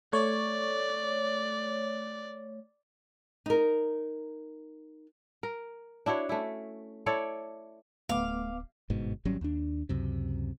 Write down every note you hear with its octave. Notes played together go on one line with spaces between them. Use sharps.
A3 C#5 D5
D#4 A#4
A#4
D4 E4 F#4 C#5
A3 C#4 E4
E4 A4 C#5 D5
D1 A3 B3 F5 D6
G1 G#2 B2
G#1 F#3 G3 C#4
D#2 D4
C#2 F#2 C3